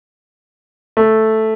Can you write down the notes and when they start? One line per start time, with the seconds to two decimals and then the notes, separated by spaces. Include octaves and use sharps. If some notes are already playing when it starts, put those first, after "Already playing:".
0.97 A3